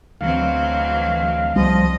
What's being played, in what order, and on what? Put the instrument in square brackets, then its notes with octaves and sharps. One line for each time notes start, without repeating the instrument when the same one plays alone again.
[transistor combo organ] D2 F5 [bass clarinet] E3 [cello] F#3 C4
[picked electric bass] C2 G3 [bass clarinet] F3 [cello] D#5